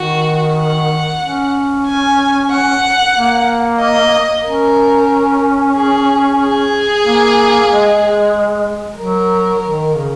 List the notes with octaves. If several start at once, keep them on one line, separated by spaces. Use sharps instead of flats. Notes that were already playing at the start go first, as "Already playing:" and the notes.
Already playing: D#3 F#4
F#5
C#4
G#5
F#5
A#3
D#5
C#4 A#4
G#4
G#4
A#3
G#3
F#3 A#4
D#3
C#3